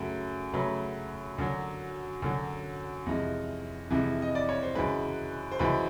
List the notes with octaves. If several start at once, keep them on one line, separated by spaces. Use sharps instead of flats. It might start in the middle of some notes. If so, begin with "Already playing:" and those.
Already playing: F#2 C#3 F#3 A3
F#2 C#3 F#3 A3 B4
F#2 D3 F#3
F#2 D3 F#3
F2 C3 E3 G#3
F2 C3 E3 G#3
D#5
D5
C#5
C5
F#2 C#3 E3 G#3 B4
C5
F#2 C#3 E3 G#3 B4